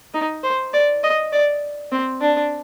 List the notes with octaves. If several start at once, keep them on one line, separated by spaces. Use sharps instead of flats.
D#4
C5
D5
D#5
D5
C4
D4